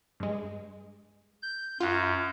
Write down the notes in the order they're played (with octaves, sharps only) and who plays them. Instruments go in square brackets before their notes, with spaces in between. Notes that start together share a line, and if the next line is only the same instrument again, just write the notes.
[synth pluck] G2 G#3
[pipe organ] G6
[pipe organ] F#2 [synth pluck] F4 F#5